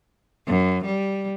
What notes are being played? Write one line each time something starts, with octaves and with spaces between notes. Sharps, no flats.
F#2
G3